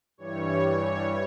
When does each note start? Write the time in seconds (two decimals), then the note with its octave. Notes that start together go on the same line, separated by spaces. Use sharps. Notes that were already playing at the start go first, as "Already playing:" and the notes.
0.17 G2 E3 G3 C#5